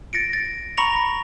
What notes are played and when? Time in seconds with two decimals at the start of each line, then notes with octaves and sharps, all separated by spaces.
0.13 A6 A#6 C#7 D7
0.33 A6
0.77 A#5 B5 C#6 A#6 C#7 F7